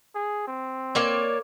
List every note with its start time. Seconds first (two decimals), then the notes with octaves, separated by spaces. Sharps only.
0.15 G#4
0.47 C4
0.95 A#3 C#5 D5